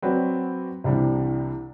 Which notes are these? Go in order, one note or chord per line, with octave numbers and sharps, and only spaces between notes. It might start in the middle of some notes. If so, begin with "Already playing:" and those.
F#3 C4 F#4 B4 D5
C2 C3 E3 G3 D4